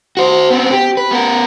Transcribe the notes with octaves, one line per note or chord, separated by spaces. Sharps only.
F#4 C5
B3 C4
G4
B4
B3 A#4